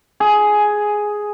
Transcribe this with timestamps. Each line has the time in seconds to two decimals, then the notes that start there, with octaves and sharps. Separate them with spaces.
0.20 G#4